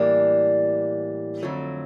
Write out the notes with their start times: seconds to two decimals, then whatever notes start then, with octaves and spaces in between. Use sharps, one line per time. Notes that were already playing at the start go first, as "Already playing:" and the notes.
Already playing: A2 E3 G3 A#3 D4
1.42 F2 D3 F#3 A3